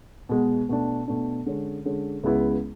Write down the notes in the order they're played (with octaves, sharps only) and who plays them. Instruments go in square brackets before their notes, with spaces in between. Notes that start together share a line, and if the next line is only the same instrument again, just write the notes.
[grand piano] B2 G#3 B3
B2 A3 D4
B2 A3 D4
D3 G#3 C#4
D3 G#3 C#4
C#2 C#3 G#3 B3 E4